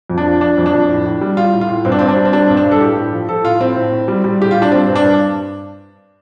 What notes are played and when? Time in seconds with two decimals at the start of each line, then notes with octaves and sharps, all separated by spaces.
0.10 F2
0.18 D4
0.26 F3
0.41 F3 D4
0.58 F2
0.66 D4
0.73 F2
0.89 A2
1.06 A2
1.21 G3
1.37 G3 F4
1.53 A2
1.61 F4
1.69 A2
1.85 G2 C4
1.92 D4
1.99 G2 C4
2.09 D4
2.17 G3
2.25 C4
2.33 G3 D4
2.47 G2 C4
2.57 D4
2.65 G2
2.71 A4
2.81 A2 G4
2.96 A2
3.12 F3
3.29 F3 A4
3.44 A2 F4
3.60 A2 C4
3.76 A2
3.92 A2
4.08 G3
4.24 G3
4.40 A2 G4
4.51 A2 F4
4.62 D4
4.71 G3 C4
4.88 G2
4.95 D4
5.03 G2